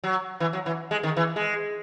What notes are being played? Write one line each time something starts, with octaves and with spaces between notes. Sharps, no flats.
F#3
E3
F#3
E3
G#3
D#3
E3
G#3